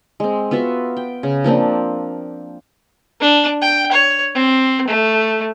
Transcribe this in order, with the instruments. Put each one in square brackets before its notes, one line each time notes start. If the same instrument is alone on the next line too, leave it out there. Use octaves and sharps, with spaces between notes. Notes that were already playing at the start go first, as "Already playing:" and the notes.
[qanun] G#3 C4
B3 F4 F#4 E5
G5
C#3
F3 A#3 C4 D4
[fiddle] D4
G5
C#5
C4
A3